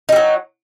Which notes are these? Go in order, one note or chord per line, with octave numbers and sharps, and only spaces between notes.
F#3 G3 D#4